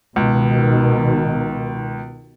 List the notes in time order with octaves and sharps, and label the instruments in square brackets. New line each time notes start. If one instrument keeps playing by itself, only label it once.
[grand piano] C#2 [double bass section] B2 D#3